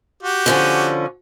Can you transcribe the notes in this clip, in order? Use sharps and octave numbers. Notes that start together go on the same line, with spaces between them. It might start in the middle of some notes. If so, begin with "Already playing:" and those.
F#4 G4
D3 F3 C#4